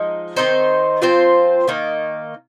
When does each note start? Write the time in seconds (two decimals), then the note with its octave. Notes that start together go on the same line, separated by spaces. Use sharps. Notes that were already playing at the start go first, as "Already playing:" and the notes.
Already playing: F3 G#3 D#4
0.36 D#3 C4 D#4 C5
1.02 F3 C4 F4 C5
1.68 D#3 A#3 D#4